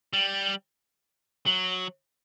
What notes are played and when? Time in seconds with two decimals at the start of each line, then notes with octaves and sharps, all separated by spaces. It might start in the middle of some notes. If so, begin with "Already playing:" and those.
0.13 G3
1.46 F#3